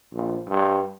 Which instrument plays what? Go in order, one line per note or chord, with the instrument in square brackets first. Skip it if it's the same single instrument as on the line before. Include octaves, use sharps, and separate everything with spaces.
[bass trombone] A#1
G2